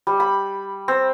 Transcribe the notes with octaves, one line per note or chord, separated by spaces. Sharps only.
G3
B5
C4